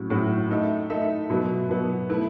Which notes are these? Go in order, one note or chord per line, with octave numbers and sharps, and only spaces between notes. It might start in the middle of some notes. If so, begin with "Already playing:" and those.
Already playing: A2 F#3 C#4
A2 F#3 C#4 F#4
A3 D#4 A4 E5
A3 D#4 A4 E5
B2 F#3 B3
B2 F#3 B3
A3 E4 B4